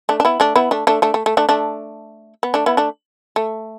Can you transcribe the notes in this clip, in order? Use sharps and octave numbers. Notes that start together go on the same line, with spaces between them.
A3 D4
D4
B3 E4
A3 D4
B3 E4
A3 D4
A3 D4
A3 D4
A3
A3
A3 D4
A3 D4
B3
A3 D4
B3 E4
A3 D4
A3